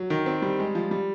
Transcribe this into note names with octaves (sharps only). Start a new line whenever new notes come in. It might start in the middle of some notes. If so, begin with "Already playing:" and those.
Already playing: F#3
D#3
C4
G3
G#3
F3
G3